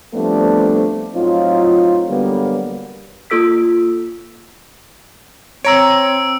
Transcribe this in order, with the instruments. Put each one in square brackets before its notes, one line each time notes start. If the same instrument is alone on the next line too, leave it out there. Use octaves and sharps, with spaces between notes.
[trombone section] F3 G3 A3 B3 C4 D4
A2 F#3 C4 D#4 F4
D3 F#3 G3 A#3 B3
[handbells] A#3 F4 A4 E6 B6
[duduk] C4 [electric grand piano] C#5 A#5 [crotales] E6 D7